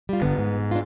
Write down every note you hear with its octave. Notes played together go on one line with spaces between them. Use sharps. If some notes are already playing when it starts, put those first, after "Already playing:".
G3 F4
G1 D3 B3
G#2
D4 F4